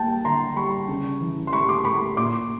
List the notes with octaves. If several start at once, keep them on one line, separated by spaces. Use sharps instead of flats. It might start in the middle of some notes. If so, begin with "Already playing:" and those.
Already playing: G3 A#3 G5 A5
D3 A#5 C6
G3 B5 C#6
C#3
E3
C6
A3 B5 C#6
C6 D6
A3 B5 C#6
A#2 C6 D6